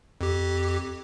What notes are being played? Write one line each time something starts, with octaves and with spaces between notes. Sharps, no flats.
F2 G4